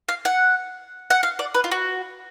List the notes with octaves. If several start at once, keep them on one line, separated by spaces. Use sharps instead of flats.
F5
F#5
F#5
F5
D5
B4
F4
F#4